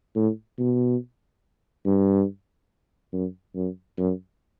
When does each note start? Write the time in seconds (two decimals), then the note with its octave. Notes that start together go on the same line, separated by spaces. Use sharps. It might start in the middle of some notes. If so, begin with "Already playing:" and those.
0.16 A2
0.58 B2
1.85 G2
3.13 F#2
3.55 F#2
3.98 F#2